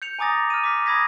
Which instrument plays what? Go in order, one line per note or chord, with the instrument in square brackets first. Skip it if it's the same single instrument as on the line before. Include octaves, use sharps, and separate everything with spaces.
[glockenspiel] G6 C#7 F7
G#5 A#5 D6 D#6 A6 A#6
F6 D#7
D6 B6
B5 D#6 G#6 A#6 B6